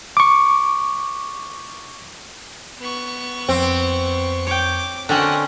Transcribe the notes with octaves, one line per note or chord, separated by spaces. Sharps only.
C#6 D6
B3 C#6
F2 C4
C#5 G5 D6
D3 C4 C#4 F#4 D#5